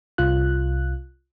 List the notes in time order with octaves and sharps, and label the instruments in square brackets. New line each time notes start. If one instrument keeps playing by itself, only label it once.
[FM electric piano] C2 F4 F#6